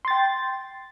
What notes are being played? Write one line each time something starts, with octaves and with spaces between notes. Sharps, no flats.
G5 C6 A6